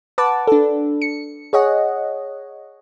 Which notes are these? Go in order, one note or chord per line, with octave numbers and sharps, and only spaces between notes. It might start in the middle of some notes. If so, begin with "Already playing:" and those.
B4 F#5 A5 D6
D4 A4
C#7
G#4 C#5 D#5 F#5